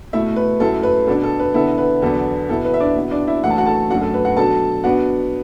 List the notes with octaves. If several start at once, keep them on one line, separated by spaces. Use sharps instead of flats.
B2 A3 E4 E5
B4
F#2 F#3 A3 E4 A4
B4
B2 B3 D4 A4
A4
B4
D3 B3 E4 A4
B4
E2 D3 F#3 B3 A4
B2 B3 E4 A4
B4
E5
D4 D5
B2 B3 E4
D4 D5
E4 E5
F#2 E3 A3 D4 F#5
A5
F#4 F#5
A4 A5
F#2 F#3 A3 D4 F#4 F#5
A4
B4
F#4 F#5
B2 F#3 D4 A4 A5
B2 B3 D4 F#4 F#5